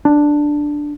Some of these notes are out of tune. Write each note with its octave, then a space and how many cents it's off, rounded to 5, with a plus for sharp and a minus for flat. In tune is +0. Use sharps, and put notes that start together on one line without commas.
D4 +5